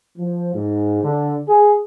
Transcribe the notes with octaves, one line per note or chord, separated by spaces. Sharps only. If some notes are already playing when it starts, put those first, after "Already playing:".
F3
G#2
D3
G#4